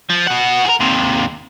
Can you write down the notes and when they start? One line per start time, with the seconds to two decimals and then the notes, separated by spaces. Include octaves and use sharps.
0.10 F3
0.27 B2 F#5
0.65 G#4 A#4
0.80 D#2 C3